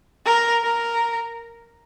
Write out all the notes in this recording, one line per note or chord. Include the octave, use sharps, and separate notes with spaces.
A#4
A#4